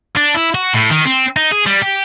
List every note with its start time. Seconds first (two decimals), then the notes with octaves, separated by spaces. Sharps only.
0.16 D4
0.34 E4
0.55 F#4
0.73 A2
0.90 D#3
1.05 C4
1.37 D#4
1.52 G#4
1.66 G3
1.82 G4